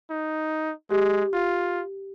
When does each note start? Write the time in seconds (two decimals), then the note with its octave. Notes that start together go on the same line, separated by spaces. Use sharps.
0.10 D#4
0.91 G#3 G4
1.33 F4